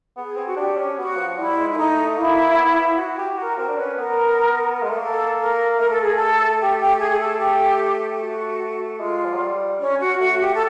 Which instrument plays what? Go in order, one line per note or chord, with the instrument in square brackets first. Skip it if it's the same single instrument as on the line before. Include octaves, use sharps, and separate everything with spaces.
[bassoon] B3 [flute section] G#4
[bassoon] C4
[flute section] F#4
[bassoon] D4 [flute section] G4
[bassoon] C#4
[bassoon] B3 [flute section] F#4
[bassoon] F3
[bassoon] G3 [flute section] E4
[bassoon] G#3
[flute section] E4
[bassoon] A3 [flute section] D#4
[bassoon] A#3 [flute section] E4
[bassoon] B3
F#4
G4
[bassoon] F#4 [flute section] A#4
[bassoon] C4 [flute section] A#4
[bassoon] D4
[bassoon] C#4 [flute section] B4
[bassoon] B3 [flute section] A#4
[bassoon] G#3
A3
[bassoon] A#3 [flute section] A4
[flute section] A#4
[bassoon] A3 [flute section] A#4
[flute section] A4
G#4
A4
G4
G4
G#4
G#4
A4
G4
F#4
[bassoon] G#3 [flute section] F4
[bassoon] F3
F#3
G3
[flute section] C#4
F#4
[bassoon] A3 [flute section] F#4
[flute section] G4
A4